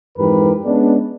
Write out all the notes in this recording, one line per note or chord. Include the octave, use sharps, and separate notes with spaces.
F2 G#2 E3 G4 A#4 B4
G#3 B3 C#4 D4